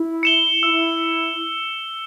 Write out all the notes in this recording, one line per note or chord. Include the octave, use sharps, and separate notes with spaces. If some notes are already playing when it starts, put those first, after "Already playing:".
Already playing: E4
C#7 E7 G7
E4 E6